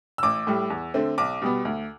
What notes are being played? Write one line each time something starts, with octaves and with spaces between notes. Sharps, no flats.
E6
A1 D6
A2 G3
E2
D3 A3 C4
B1 D6
B2 G3 B3
D2